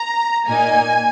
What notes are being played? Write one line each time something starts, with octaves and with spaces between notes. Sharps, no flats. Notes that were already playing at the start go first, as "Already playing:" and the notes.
Already playing: A#5
A#2 A#3 D#4 G#5